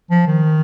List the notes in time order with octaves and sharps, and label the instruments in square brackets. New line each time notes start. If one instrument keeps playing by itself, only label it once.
[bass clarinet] F3
D#3